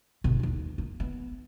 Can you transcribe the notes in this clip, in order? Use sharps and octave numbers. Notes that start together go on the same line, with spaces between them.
G1 B2
D#2 D#4
A#3
B3